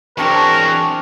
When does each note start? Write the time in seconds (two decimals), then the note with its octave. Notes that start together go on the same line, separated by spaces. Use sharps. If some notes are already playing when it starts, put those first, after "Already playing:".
0.18 E2 F#3 C4 D4 A#4 A5 C#6